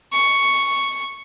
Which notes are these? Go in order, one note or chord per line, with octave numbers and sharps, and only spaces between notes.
C#6